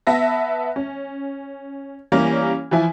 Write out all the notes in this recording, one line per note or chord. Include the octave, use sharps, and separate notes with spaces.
B3 E5 A5 A#6
C#4
E3 G3 A#3 C#4
E3 F3 E4 G#5